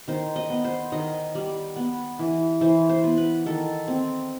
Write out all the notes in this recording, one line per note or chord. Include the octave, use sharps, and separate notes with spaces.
D#3 C5
D#5
B3
C5
D#3 D#5
G3
B3
E3
E3 C5
C5
B3
B4
D#3 A4
C4